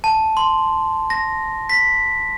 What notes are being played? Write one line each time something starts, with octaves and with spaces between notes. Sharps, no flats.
A5
C6
A#6
B6